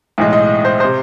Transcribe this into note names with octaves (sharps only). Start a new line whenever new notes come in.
B1 A2 E3 G#3
D#5
C5
C3 C5